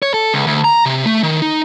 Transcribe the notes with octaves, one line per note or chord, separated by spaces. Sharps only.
C#5
A4
C#2
D2
A#5
C3
A3
D#3
D#4